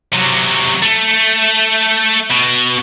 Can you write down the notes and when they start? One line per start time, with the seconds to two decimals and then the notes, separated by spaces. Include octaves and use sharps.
0.13 C3 F#3
0.82 A3
2.31 B2